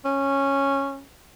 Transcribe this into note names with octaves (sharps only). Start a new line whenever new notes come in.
C#4